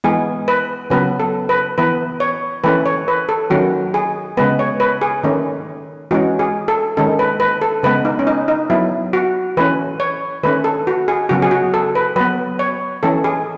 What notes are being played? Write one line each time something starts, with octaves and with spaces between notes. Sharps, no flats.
E3 G#3 B3 G#4
B4
C#3 F#3 B3 B4
A4
B4
E3 B3 B4
C#5
E3 A3 C#4 B4
C#5
B4
A4
D#3 F#3 A3 C#4 F#4
G#4
C#3 G#3 B3 B4
C#5
B4
G#4
D#3 A3 C#4
E3 G#3 C#4 F#4
G#4
A4
D#3 G#3 C#4 A4
B4
B4
A4
C#3 G#3 B3 B4
D#4
C#4
D#4
D#4
F#3 B3 E4
F#4
E3 A3 C#4 B4
C#5
D#3 A3 C#4 B4
A4
F#4
G#4
C#3 F#3 B3 F#4
G#4
F#4
A4
B4
F#3 B3 B4
C#5
E3 A3 C#4 A4
G#4